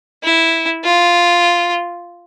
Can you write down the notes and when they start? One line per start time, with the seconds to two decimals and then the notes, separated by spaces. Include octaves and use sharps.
0.24 E4
0.85 F4